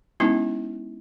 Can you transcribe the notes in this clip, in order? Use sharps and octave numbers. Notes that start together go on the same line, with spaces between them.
G#3 B3 C#4 D#4 E4